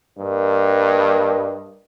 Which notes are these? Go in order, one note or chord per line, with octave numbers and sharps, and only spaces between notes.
G2 A#3 A#4 D#5